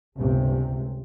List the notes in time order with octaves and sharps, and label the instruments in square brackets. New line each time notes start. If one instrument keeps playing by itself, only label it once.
[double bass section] G1 C#2 C3